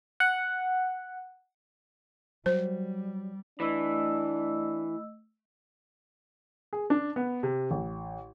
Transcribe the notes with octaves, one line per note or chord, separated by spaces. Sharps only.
F#5
F#3 G3 C5
E3 A3 D4 D#5 E6
G#4
D4
B3
C3
A1